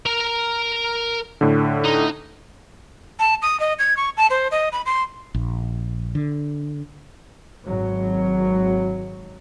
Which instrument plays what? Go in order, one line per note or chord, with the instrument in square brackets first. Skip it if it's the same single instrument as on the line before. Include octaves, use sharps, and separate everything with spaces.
[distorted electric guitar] A#4 A#5
[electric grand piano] A2 D3
[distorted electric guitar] D#4
[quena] A5
D#6
D#5
G#6
C#6
A5
C5
D#5
B5
C6
[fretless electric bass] A#1
D3
[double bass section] G#1 F#3